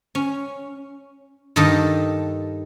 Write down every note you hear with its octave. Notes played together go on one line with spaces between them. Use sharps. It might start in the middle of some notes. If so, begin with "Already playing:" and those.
C#4
G2 D#3 G4 A4 D#5 A5